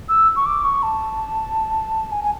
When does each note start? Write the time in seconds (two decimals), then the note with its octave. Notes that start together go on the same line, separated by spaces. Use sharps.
0.09 E6
0.36 C#6
0.46 D6
0.64 C#6
0.83 A5
2.12 G#5
2.24 G#5